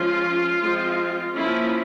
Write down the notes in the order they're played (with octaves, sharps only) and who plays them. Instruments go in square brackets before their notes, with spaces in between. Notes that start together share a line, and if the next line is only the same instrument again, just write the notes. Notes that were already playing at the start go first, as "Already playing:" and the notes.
Already playing: [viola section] F3 G#3 C#4 F4
F3 G#3 C4
F3 A#3 C#4 E4